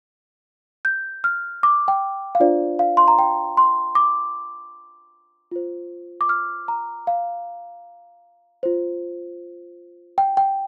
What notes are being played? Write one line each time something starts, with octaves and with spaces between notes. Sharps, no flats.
G6
F6
D6
G5
F5
D4 F4 C5 D5
F5
C6
A#5
G5
C6
D6
F4 C5
D6
F6
A#5
F5
F4 C5
G5
G5